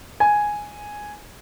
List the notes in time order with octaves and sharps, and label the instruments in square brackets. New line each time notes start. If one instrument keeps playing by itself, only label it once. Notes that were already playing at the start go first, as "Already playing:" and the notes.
[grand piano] G#5